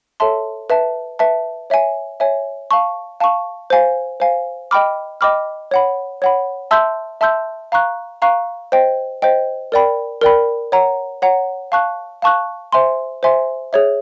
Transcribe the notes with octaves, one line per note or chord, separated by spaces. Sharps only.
A4 C#5 E5 A5 C6
B4 E5 A5
B4 E5 A5
C#5 E5 G#5
C#5 E5 G#5
F5 A5 C#6
F5 A5 C#6
C5 F5 G#5
C5 F5 G#5
D#5 G5 B5 D6 F6
D#5 G5 B5 D6 F6
C#5 F#5 B5
C#5 F#5 B5
E5 A5 C6 E6 G6
E5 A5 C6 E6 G6
F5 A#5 C#6 F#6
F5 A#5 C#6 F#6
C5 D#5 G5
C5 D#5 G5
A#4 D5 G5 B5
A#4 D5 G5 B5
C#5 F#5 A#5
C#5 F#5 A#5
F5 A5 C#6 F#6
F5 A5 C#6 F#6
C5 E5 G#5 C6
C5 E5 G#5 C6
G#4 C#5 E5